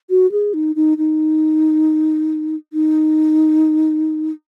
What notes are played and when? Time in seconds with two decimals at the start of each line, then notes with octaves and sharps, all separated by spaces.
0.10 F#4
0.32 G#4
0.54 D#4
0.76 D#4
0.98 D#4
2.73 D#4